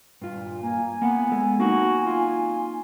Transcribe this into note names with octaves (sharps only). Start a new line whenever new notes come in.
G2 A#2 F4
A#3 G#5
A#3 B3 F#5
G#3 A4
A#3 C4 D#4 F#4
F4